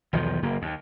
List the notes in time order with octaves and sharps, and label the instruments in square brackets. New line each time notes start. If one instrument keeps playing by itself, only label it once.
[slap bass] B1 E2 D#3 F3
F#1 A#3
D#2